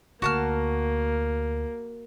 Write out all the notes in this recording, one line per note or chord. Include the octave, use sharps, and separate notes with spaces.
D2 A#3 F#4 A5 F6